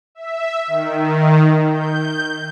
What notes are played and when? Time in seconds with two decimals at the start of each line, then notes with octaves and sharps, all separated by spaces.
0.15 E5
0.67 D#3
1.70 G6